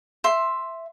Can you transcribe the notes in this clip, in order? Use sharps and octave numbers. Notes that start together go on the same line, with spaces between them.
E5 C6